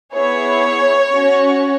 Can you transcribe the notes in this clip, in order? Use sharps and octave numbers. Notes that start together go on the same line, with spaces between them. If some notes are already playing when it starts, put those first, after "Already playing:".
B3 E4 G#4 C#5
C#4 F#4